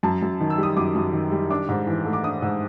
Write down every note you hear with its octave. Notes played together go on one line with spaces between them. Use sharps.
F#2 A5
F#2
D#3
E6
G3 D#6
F#2 D6
F#2
D#3
G3
D4 D6
G#2
E3
A3
D6
D4 D#6
G#2 E6